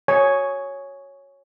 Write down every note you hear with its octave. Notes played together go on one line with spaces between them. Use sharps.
C#5 G#5